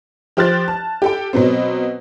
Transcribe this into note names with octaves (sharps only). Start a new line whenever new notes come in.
F3 G4 C5 F6 F#6 A6
A5
G4 A4 G5
B2 F#3 B3 C4